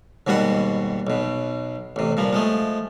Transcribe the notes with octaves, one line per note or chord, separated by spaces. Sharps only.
D#2 G#2 B2 G3 F#4 F#5
B1 B2
A1 C3
G2 A#2 F3
F3 G#3 A3